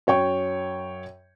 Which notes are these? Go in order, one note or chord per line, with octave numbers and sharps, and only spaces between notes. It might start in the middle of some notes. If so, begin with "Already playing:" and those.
F#2 C#5 G5 C#6